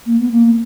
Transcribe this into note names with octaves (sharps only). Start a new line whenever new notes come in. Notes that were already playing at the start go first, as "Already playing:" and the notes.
A#3
B3
A#3